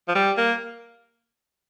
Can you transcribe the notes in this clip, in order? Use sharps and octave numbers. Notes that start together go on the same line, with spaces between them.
F3
G3
A#3